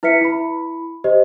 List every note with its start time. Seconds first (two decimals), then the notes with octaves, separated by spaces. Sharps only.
0.03 E4 B4 E5 B6 C#7
0.21 E4 B5
1.04 G4 C5 D#5